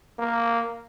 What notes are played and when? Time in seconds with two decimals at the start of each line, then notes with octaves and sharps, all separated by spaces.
0.19 A#3